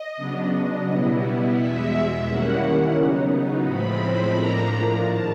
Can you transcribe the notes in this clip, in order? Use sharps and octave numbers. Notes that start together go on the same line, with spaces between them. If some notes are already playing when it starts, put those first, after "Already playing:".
Already playing: D#5
C#3 F#3 B3 D4
B2 G3 B3 E4
E2 B2 G#3 E5
D#3 G3 A#3 C#4 E4 F#5
C#3 F#3 B3 D#4
A2 F3 G#3 C4 B5
A2 F3 A#3 D4 A#5
G#2 D#3 A5